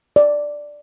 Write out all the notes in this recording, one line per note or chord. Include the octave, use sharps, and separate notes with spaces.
D5